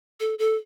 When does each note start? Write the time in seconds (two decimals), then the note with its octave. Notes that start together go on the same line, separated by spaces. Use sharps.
0.20 A4
0.39 A4